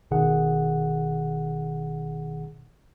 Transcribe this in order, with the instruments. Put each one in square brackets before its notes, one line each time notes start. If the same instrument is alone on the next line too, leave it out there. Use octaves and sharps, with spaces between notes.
[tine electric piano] G1 B2 D#3 G#4 F#5